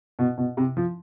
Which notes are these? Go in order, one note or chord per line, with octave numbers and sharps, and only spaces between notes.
B2
B2
C3
F3